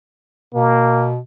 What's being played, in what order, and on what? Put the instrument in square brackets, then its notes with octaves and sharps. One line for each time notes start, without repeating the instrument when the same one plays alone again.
[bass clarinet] B2 [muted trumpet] A#3